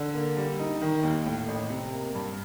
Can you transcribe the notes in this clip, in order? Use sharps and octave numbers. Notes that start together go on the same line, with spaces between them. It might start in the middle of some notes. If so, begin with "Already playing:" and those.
Already playing: D3
A#3
G3
D#4
D#3
D#2
A2
A1
C3
A#3
G2